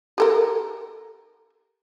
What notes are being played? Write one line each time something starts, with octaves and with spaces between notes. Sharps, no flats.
G4 A4 A#4